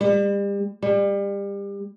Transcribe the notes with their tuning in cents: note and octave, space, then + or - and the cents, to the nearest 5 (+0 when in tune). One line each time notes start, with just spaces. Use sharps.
G3 +35
G3 +30